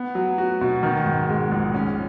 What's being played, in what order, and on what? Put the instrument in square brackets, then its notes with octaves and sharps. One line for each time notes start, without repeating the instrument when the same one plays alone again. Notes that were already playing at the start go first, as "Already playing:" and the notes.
Already playing: [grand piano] B3
F#3
F#4
B2
D#3
G#2
G#3
A#1
C#4